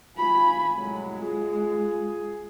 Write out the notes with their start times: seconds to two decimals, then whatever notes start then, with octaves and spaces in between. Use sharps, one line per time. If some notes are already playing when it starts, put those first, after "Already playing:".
0.18 G#1 F4 G#5 B5
0.76 C2 A2 F#3 G#3
1.19 F4 G#4